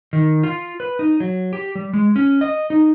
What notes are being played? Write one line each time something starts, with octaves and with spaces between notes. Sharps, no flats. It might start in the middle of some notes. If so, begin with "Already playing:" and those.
D#3
F4
B4
D#4
F#3
G4
G3
G#3
C#4
D#5
D#4